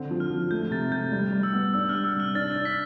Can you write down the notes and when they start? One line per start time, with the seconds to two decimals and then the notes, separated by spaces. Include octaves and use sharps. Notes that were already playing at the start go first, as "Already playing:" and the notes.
Already playing: D3 C4
0.11 F3
0.20 F6
0.30 F3
0.51 A3 G6
0.71 C3 A6
0.91 A3 G6
1.12 G3
1.32 G3
1.43 E6
1.53 B3
1.74 D4 E6
1.89 G3 F6
2.04 E6
2.15 C3
2.20 F6
2.35 D4 A6
2.55 D4
2.65 B6